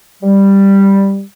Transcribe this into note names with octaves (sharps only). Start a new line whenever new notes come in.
G3